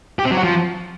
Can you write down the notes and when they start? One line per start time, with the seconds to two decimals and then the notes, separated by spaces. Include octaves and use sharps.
0.19 G4
0.25 C4
0.31 F#3
0.37 F#4
0.43 F3